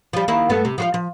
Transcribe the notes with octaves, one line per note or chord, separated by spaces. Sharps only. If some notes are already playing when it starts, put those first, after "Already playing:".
F3 G3
D#3 A#3 E4
G2 A3 B3
C3
F3 F#4 F5
F3